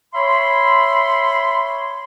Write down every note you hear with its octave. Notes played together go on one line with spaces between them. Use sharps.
C#5 E5 B5 C6